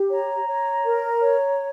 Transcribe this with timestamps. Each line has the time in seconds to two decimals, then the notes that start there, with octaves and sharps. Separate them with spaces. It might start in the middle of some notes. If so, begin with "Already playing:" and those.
Already playing: G4
0.10 C#5 A#5
0.48 C#5
0.85 A#4
1.22 C#5